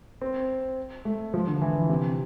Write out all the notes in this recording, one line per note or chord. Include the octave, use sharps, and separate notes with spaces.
C4
A3
F3
D3
E3
C3